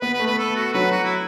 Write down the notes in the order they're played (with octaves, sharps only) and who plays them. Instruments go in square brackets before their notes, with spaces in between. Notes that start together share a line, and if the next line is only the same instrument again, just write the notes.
[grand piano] B3 [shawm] B4
[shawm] B4
[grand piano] A3
[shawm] B4
A4
F#4
[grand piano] F#3 [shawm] B4
[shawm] F#4
E4